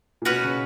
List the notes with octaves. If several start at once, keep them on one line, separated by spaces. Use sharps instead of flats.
A#2
B2 C#4 F#4 B4
C#3